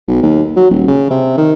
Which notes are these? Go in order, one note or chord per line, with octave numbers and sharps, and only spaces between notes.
B1
D#2
F#3
D#1
C#3
C3
D#3